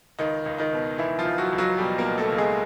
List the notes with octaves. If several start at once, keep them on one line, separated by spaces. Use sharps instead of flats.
C#2 D#3 D#4
C#2
D#3 D#4
B2
B2 E3 E4
F3 F4
C#2
F#3 F#4
C#2
F#3 F#4
B2 G3 G4
A#3 A#4
B2
A3 A4
C#2
G#3 G#4